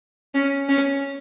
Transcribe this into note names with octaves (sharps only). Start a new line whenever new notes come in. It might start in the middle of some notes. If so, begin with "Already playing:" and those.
C#4
C#4